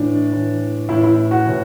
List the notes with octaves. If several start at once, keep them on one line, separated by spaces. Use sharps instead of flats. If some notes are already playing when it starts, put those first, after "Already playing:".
Already playing: A2 E3 D4
A2 E3
A2 E3 E4
E4
F#4
A2 E3